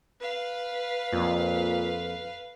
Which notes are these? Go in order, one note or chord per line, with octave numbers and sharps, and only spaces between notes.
B4 F5
F2 A#2